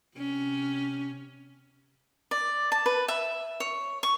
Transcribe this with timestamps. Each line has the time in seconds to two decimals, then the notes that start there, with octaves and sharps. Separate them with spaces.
0.18 C3 C#4
2.31 D5
2.72 A5
2.86 B4
3.08 E5
3.60 C#5
4.03 C#6